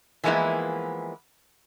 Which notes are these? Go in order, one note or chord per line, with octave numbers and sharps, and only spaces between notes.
E3 F3 G#3 A#3 B3 E4